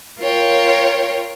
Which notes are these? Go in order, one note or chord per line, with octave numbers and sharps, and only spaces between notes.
F4 A#4 C#5 G5